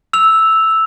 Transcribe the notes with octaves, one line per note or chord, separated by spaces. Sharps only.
E6 F7